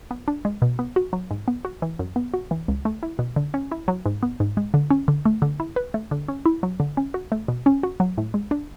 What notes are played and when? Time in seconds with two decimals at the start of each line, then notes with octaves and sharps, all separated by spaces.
0.11 B3
0.28 D4
0.45 G#3
0.62 B2
0.79 B3
0.96 F#4
1.13 F#3
1.31 G#2
1.48 B3
1.65 F#4
1.82 E3
1.99 F#2
2.16 B3
2.34 F#4
2.51 E3
2.68 C#2
2.85 A3
3.03 E4
3.19 B2
3.36 D3
3.54 C#4
3.72 E4
3.88 F#3
4.06 G#2
4.23 B3
4.40 G#2
4.57 G#3
4.74 D3
4.91 C#4
5.08 D3
5.25 A3
5.42 D3
5.60 E4
5.76 B4
5.94 A3
6.11 D3
6.28 C#4
6.46 E4
6.63 F#3
6.80 D3
6.97 C#4
7.14 F#4
7.32 A3
7.48 B2
7.66 C#4
7.83 F#4
8.00 F#3
8.18 A2
8.34 G#3
8.51 D4